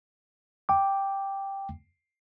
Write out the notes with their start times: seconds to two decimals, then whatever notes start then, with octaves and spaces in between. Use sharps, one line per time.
0.69 G5 D6